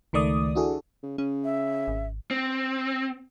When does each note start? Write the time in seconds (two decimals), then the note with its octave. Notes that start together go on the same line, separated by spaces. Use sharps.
0.13 C#2 D#3 A3 D5 D#6
0.55 D4 E4 F#4 G#4 A4
1.03 C#3
1.18 C#3 C#4
1.44 E5
1.88 G#1
2.31 C4